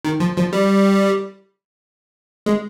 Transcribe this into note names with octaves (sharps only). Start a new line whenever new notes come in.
D#3
F3
F3
G3
G#3